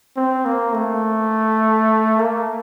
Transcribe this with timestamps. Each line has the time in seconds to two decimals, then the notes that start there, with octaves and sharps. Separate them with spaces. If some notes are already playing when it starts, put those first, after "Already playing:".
0.16 C4
0.45 A#3
0.74 A3
2.19 A#3